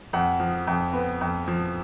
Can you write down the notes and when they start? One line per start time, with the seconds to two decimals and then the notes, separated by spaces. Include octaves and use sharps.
0.13 F2 F#5
0.40 F3
0.67 F2
0.93 B3
1.21 F2
1.48 F3